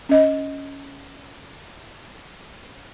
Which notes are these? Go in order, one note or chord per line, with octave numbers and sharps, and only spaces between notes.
C#4 D#5